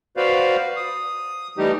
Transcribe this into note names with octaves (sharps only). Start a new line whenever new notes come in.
F#4 B4 C5 D5 F5
D#6
E3 G3 A3 D#4 G4